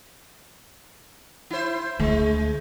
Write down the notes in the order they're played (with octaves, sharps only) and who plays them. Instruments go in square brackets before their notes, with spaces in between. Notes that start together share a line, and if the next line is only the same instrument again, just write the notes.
[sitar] E4 C5
[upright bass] D2 [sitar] G#3